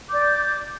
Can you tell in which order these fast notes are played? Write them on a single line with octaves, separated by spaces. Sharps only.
D6 G6 D5